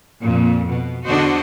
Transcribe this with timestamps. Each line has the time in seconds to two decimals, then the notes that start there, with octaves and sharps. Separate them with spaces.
0.20 F2 A#2
0.67 B2
1.06 E2 D3 D4 F#4 C5 D#5